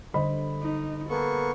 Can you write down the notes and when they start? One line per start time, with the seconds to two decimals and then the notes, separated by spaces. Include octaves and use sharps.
0.14 D3 G3 C5 D#5 B5
0.62 D#4
1.10 A#3 B3 A4 C#6